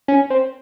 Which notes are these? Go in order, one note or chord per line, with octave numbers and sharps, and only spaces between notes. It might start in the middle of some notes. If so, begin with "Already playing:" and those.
C#4
C4